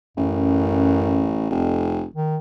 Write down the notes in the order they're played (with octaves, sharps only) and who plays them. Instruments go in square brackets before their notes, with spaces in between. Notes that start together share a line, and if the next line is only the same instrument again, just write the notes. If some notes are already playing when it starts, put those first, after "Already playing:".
[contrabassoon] A1 [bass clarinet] F#2
[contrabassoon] F1 [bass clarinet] F2
[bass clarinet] D#3